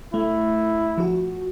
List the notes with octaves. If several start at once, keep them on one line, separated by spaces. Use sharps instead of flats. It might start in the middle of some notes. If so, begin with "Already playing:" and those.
A3 E4
F3 F#4